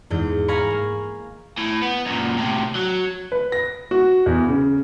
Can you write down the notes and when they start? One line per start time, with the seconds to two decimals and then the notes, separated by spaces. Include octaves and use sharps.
0.10 E2 G#2 G6
0.48 F5 G#5 A#5 B5 C#6
0.70 A#3
1.57 A2
1.82 B3
2.06 F#2 A#2
2.38 A2 C3
2.75 F#3
3.32 B4
3.52 A#6
3.91 F#4
4.26 E2
4.48 C#3